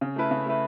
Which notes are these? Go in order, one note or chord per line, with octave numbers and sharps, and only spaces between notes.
C#3
A3 E4 B4
C#3
A3 E4 B4